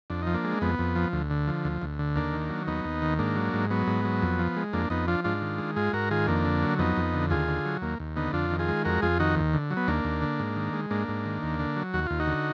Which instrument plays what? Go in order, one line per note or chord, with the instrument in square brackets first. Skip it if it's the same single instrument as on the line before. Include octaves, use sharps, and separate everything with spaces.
[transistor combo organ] F2 D4
F3 D#4
A#3 D4
G#3
F2 B3
F2
F3
D2
D3
F3
D2
D2
D3
D#2 A#3 D4
D#3
F#3
D#2 B3 D#4
D#2
D#3
G#2 A#3 D4
F#3
G#2
F#3 B3
G#2
F#3
F2
F3
G#3
F2 A#3 D4
F2 B3 D#4
F3 D4 F4
G#2 D4 F4
D#3
G#3
G#2 F4 G#4
G#2 F#4 A#4
D#3 F4 G#4
F2 A#3 D4
D3
F#3
F2 B3 D#4
F2
D3
D#2 F4 G#4
D3
F#3
D#2 A#3
D#2
D3 B3 D#4
F2 D4 F4
D#3
F4 G#4
G#3
F2 F#4 A#4
F2 F4 G#4
D#3 D#4 F#4
D#2
D3
F#3
B3
D#2 A#3 D4
D#2
D3
G#2
D#3
G#3
G#2 A#3 D4
G#2
D#3
D#2
D3
F#3
D#2 F#4
D#2 F4
D#4 F#4
D3